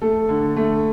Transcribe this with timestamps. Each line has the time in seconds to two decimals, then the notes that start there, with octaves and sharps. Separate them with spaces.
0.02 A3 A4
0.29 D3
0.56 A3